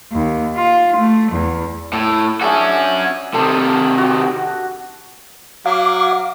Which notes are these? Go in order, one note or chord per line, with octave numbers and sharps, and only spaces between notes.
D#2
F4
A3
E2
A2
C#4 D4 F#4 G#4 E5
C3 D#3 A4
F#4 G4
F#3 F5 D6